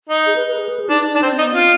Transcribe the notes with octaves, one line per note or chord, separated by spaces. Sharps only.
D#4
G#4
B4
B4
G#4
B4
G#4
D4 D#4
D#4
D4 D#4
C4 D4
C4
D#4
B3
C4 F4